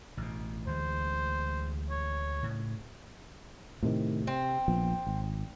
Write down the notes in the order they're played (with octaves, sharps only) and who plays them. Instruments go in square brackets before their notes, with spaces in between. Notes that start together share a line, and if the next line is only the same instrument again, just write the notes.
[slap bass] A1 B2
[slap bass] D2 E3 G#3 [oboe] C5
[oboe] C#5
[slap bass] A2 C#3
[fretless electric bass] A2 C3 D#3
[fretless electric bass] C3 [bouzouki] C4
[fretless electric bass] A#1 F3 B3
G#1